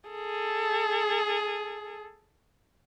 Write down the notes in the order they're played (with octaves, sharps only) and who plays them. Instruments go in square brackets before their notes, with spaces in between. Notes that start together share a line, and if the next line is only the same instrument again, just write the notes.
[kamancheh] G#4 A4